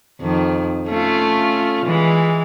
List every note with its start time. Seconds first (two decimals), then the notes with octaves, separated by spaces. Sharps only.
0.21 F2 D#3
0.88 A3 C#4 F4
1.86 E3 G#3